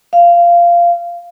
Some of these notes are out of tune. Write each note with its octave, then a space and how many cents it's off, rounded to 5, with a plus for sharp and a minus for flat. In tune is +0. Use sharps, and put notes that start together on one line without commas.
F5 -15